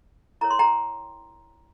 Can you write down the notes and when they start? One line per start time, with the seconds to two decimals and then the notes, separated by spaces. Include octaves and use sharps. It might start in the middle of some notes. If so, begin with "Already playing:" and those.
0.41 E4 A#4 C#5 A#5
0.50 C6
0.59 G5 A#5